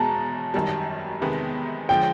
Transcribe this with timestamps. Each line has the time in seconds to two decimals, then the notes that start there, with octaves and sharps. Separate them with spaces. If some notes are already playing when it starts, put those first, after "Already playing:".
Already playing: E2 B2 G#3 A5 A#5
0.54 G#1 F#2 D#3 G3
1.21 E2 C3 D#3 G#3 B3
1.89 D3 F3 G#3 G5